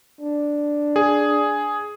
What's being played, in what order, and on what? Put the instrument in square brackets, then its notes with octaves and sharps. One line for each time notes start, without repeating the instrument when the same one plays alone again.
[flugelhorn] D4
[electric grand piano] G#4